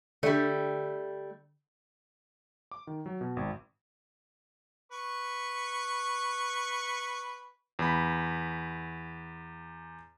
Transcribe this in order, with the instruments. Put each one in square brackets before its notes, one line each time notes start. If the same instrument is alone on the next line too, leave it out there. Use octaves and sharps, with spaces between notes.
[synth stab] D3 [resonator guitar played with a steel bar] G3 A3
[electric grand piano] D6
D#3
F#3
B2
G#1
[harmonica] B4 C#6
[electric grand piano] E2 B5